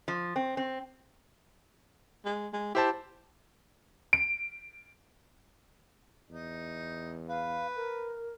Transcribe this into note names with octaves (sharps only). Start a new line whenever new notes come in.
F3
C4
C4
G#3
G#3
E4 G4 C5 A5
D7
E2 D#4
B4 F5
A#4